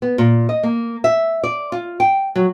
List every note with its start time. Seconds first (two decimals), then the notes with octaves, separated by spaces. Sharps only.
0.02 B3
0.18 A#2
0.49 D#5
0.63 A#3
1.04 E5
1.44 D5
1.72 F4
2.00 G5
2.36 F#3